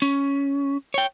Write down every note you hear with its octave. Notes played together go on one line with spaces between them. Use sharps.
C#4
C#5 G5